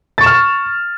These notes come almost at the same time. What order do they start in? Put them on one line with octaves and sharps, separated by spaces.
A6 C#6 E7 F6